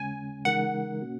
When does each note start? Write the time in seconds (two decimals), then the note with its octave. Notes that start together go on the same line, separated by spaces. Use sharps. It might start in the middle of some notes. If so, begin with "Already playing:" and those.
Already playing: D#2 C#3 G#3 C#4 G#5
0.45 C#3 E3 G#3 D#4 A#4 F#5
1.01 B2 A#3 C#4 F#4